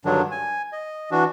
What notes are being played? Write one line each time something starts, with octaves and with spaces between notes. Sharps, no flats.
G2 D3 D#3 F#3 D4
G#5
D#5
E3 D4 F#4